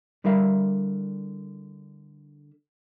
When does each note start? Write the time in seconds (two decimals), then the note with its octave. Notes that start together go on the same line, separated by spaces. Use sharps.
0.24 D3 G3 E4 A#4 E5 F5